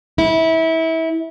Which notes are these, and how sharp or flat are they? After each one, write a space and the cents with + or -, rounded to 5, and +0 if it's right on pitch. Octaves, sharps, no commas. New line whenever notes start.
E4 -25